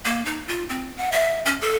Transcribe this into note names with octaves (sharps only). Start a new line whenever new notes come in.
A#3
D#4
F4
C4
F#5
E5
C#4
A4